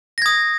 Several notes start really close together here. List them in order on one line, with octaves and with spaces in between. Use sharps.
A#6 G#6 D#6